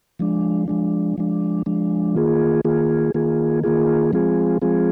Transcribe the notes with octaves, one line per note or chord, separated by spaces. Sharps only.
F3 G#3 D4
F3 G#3 D4
F3 G#3 D4
F3 G#3 D4
D#3 A#3 F4 G#4
D#3 A#3 F4 G#4
D#3 A#3 F4 G#4
D#3 A#3 F4 G#4
F3 G#3 C4 F4 G#4
F3 G#3 C4 F4 G#4